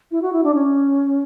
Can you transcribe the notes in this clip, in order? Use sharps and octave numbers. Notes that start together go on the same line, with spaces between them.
E4
F#4
E4
D4
C#4